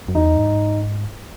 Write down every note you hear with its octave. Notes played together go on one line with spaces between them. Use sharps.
F#2
E2 D#4
G#2